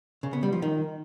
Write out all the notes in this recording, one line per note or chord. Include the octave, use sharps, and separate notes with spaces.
C#3
B3
G3
F3
D#3